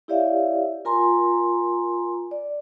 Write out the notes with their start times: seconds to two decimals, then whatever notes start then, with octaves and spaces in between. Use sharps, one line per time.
0.08 E4 G4 C#5 D5 E5 F5
0.85 F4 A#4 G#5 A#5 C6
2.31 D5